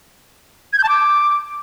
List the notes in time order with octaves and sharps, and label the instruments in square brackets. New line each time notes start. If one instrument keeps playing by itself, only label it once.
[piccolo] G#6
G6
A5
D6